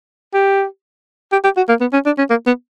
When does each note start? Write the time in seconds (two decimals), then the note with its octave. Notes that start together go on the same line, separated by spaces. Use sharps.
0.34 G4
1.32 G4
1.44 G4
1.57 F#4
1.69 A#3
1.81 B3
1.93 C#4
2.06 D4
2.18 C#4
2.30 A#3
2.46 B3